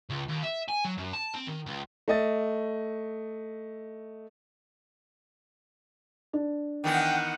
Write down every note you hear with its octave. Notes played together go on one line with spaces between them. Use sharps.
C#2
D#2
E5
G#5
F#3
F#2
A5
C4
D#3
C#2
A3 D#5 A6
D4
D#3 E3 B3 F#5 G5